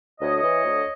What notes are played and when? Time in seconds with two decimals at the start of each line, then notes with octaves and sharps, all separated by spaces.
0.20 D2 C#5 D#5
0.42 E3
0.64 D2